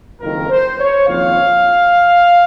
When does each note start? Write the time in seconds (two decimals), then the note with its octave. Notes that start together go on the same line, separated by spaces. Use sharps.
0.20 F#1 F2 D#3 A#4
0.49 C5
0.79 C#5
1.06 F#1 F2 D#3 A#3 F4 F5